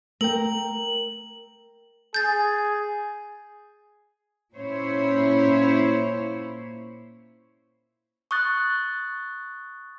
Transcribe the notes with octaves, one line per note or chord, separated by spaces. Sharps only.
A3 A#4 G5 F#7
G#4 G6 A6
A#2 A#3 C#4 E4 C5 C#5
C#6 D#6 F#6 A6